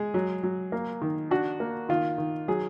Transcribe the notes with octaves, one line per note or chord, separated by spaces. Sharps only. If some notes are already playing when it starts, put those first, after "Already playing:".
Already playing: G#3 G#4
F#3
F#3
A#3
D#3
D4 F#4
A#3
D#3 F4
D#3
F#3 G#4